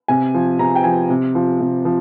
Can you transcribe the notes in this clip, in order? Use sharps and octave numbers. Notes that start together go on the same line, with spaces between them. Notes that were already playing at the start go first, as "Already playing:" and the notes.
C3 G#5
F3
C3 A#5
G5
F3 G#5
C3
F3
C3
F3